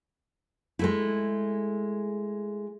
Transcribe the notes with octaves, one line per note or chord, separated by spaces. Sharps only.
G#3 A3 E4